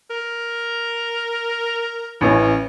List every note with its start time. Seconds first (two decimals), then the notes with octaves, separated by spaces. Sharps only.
0.10 A#4
2.21 A1 E3 C#4